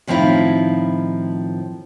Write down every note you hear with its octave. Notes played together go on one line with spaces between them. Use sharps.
A2 D#3 F3 C4 E4 F4